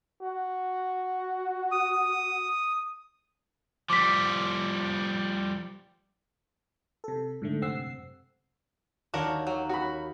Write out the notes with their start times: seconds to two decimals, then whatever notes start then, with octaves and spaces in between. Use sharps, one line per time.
0.22 F#4
1.72 D#6
3.90 F3 G3 D6 B6
7.04 C3 A4
7.42 G#2 D3 A3
7.62 F#2 C3 C4 F#5 E6 C7
9.14 D#2 D4 F#4 A#4 C#5
9.47 F#3
9.69 F#4 B5